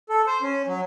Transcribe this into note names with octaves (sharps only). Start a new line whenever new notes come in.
A4
C5
C#4
F#3